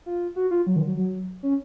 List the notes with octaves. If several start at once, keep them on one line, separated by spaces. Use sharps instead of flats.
F4
F#4
F4
F#3
D#3
F#3
F#3
C#4